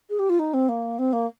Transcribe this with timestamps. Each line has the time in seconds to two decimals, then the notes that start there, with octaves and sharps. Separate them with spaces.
0.10 G#4
0.19 G4
0.29 F4
0.39 D#4
0.54 C4
0.69 A#3
0.99 C4
1.13 A#3